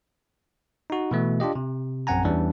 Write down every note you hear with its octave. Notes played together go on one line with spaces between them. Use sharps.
D#4 F#4
B2 E3 A3
D4 F4 G4 D#5
C3
A#1 F#2 C4 F#5 G#5 A#5
E2 E3 G3 C#4 D4